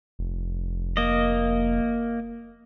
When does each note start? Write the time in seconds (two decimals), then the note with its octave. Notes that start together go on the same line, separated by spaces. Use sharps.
0.19 F1
0.97 A#3 D#5